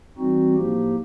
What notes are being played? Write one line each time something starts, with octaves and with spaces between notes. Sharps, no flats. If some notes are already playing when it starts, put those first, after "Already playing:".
E3 G3 C4 D#4 F#4
A2 F3 A#3 D#4 G4